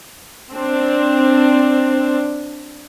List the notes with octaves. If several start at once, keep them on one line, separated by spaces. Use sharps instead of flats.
C4 D4